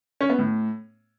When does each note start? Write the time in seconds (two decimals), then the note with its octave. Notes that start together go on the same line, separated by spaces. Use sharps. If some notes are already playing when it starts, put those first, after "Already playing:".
0.21 C#4
0.30 B3
0.39 A2